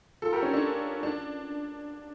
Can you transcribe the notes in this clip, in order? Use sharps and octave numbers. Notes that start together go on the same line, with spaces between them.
F4 A4
G4 A#4
C#4
D4
D4